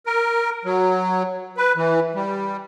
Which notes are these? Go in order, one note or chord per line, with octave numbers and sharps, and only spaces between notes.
A#4
F#3
B4
E3
G3